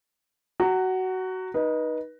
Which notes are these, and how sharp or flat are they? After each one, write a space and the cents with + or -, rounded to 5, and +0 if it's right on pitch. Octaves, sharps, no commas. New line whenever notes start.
F#4 +15 A#5 -25
D#4 +0 B4 -30